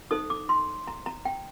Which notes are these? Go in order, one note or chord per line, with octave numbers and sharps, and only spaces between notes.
D#4 A4 C5 D#6
D6
C6
A#5
A#5
G5